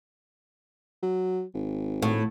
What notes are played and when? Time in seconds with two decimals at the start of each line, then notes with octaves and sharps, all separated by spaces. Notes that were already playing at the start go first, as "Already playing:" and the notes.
1.03 F#3
1.54 G#1
2.02 A2